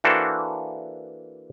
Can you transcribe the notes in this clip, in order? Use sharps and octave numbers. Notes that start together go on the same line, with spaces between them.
E3 A#3 D4 F#4 A4 C5